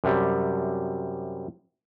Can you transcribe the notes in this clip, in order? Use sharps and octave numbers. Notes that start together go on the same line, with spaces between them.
F#2 C3 G3